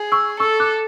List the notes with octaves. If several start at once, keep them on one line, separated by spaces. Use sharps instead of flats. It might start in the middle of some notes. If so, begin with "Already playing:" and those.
Already playing: G#4
C#6 E6
A4 C#6 E6
D6 F#6